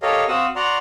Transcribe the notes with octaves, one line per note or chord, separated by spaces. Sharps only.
G4 A4 A#4 C#5 D#5 F5
C4 F#4 F5 F#5 D#6 E6
F#4 D5 F#5 A#5 C6